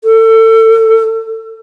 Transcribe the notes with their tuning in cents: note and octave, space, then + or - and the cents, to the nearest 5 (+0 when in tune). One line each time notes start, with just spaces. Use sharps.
A4 +30